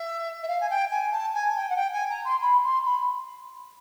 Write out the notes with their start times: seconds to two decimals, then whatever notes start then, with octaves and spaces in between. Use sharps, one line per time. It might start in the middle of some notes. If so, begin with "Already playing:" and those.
Already playing: E5
0.43 E5
0.48 F5
0.60 G#5
0.69 G5
0.91 G#5
1.11 A5
1.33 G#5
1.55 G5
1.69 F#5
1.76 G5
1.93 G#5
2.09 A#5
2.24 C6
2.41 B5
2.63 C6
2.85 B5